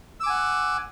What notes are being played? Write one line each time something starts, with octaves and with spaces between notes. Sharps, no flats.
F#5 G#5 D6 E6